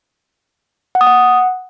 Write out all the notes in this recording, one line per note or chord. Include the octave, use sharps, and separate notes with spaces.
F#5
D#6
F#5